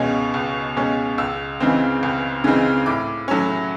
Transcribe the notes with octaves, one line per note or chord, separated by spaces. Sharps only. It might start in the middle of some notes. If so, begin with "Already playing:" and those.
Already playing: C#2 B2 G#3 C#4
C#2
B2 G#3 C#4
C#2 E6
C#3 E3 G#3 C4
C#2
C#3 E3 G#3 C4
A2 D6
F#3 A3 C#4